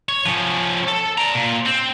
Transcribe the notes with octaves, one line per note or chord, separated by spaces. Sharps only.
C#5
F3 C#4
A4
D5 A#5
A#2
C4